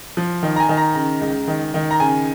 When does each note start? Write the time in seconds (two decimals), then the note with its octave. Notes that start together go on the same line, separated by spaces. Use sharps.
0.17 F3
0.43 D#3
0.56 A#5
0.60 G#5
0.69 D#3
0.77 A#5
0.95 C#3 A#5
1.21 C#2
1.48 D#3
1.74 D#3
1.91 A#5
2.00 C#3 G#5